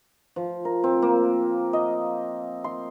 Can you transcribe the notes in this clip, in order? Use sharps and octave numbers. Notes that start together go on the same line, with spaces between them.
F3
A#4
C4
A#3
D#5
C6